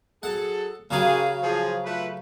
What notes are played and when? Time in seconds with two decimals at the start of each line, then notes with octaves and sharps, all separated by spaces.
0.23 F#3 G#4 A4 F#5
0.91 F#2 C#3 F#3 G4 G#4 F5
1.43 F3 G#4
1.84 A3 F4 B4